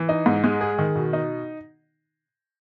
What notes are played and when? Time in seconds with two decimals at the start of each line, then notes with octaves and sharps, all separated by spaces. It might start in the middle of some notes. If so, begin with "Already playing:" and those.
Already playing: E3
0.09 D#4
0.26 G#2
0.44 G#3
0.61 G#4
0.78 D#3
0.95 B2
1.13 D#4